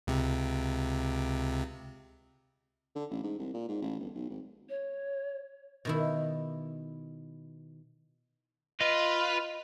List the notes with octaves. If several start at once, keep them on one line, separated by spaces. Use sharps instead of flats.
C#2 C3
D3
A1
G#2
C2
A#2
G#2
A1
G1
B1
G#1
C#5
B2 D#3 E4
F4 B4 D#5